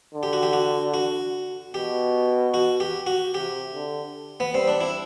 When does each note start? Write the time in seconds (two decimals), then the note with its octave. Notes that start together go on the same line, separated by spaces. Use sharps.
0.14 D3
0.23 G4
0.33 F#4
0.43 G4
0.53 F#4
0.94 F#4
1.73 B2 G4
2.54 F#4
2.80 G4
3.07 F#4
3.34 C3 G4
3.73 D3
4.40 B3
4.54 G3 C4
4.68 D4
4.81 E4